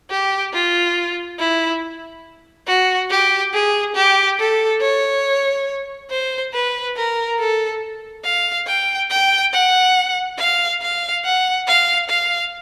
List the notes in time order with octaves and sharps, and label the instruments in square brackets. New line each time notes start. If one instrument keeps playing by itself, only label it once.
[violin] G4
F4
E4
F#4
G4
G#4
G4
A4
C#5
C5
B4
A#4
A4
F5
G5
G5
F#5
F5
F5
F#5
F5
F5